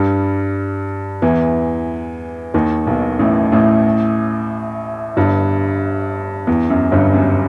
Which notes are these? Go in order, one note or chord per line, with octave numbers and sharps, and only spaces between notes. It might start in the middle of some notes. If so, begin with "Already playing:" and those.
Already playing: G2 G3
E2 E3
D#2 D#3
B1 B2
A1 A2
A1 A2
G1 G2
E2
F#2
G1 G2
F#2